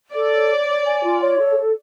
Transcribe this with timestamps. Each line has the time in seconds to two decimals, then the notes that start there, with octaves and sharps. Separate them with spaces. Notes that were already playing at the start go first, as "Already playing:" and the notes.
0.13 A4 D5
0.32 C#5
0.49 C#5
0.67 C#5
0.85 G#5
1.02 F4
1.21 C#5
1.38 A4
1.56 A4